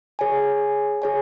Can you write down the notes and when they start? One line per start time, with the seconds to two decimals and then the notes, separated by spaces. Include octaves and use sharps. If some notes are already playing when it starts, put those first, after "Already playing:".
0.19 G#4 C#5 G#5
1.02 G#4 C#5 G#5